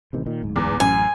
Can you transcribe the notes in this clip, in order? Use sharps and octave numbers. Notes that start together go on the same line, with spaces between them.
A1 C3 D#3
A#2 D#3
D1 G#2
E2
A1 F#2 G#5